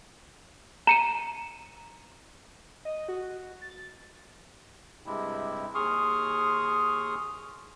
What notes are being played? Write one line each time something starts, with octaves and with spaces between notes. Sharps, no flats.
A#5 C#7 D#7
D#5
F#4
A6
G2 C3 G#3 E4
D#2 G#4 C6 C#6 D#6 F6